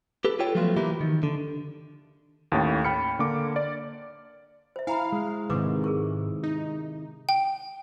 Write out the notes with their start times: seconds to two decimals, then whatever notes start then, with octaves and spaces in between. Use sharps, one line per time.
0.25 G4 A4 B4
0.39 F4 G4 A4 C#5 G5
0.55 F3 F#3 A3 B3 F4 F#4
0.76 E3 F3 A#3 E4 G4 A#4
1.01 D#3
1.23 D3
2.52 D#2 A2 C#4 C#5 G5 A6
2.85 G5 B5 F6 C#7
3.19 D3 A#3 D6
3.56 D5
4.76 C5 E5
4.87 E4 F5 G#5 A#5 B5
5.12 G#3
5.50 G#2 C3 D#3 B4 C#6 D6
5.84 G#4 A#4 C#6
6.43 D#4
7.29 G5